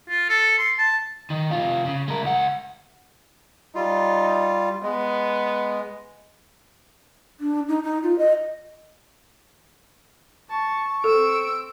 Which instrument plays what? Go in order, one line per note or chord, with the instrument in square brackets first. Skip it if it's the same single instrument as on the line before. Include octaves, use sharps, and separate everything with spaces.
[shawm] F4
A4
C6
A5
[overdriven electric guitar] D#3
C3 F4
C#3
G#3 A#4
C#2 F#5
[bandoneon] G3 F4 [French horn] D#4
[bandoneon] G#3 [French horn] B3
[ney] D4
D#4
D#4
F4
D#5
[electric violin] A5 [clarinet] C#6
[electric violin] C4 D7 [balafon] A4 [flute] E6